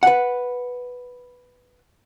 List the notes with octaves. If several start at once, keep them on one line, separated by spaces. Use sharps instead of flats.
B4 F#5